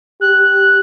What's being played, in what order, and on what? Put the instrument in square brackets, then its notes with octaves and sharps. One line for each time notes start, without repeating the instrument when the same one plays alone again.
[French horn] G4 [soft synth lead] F#6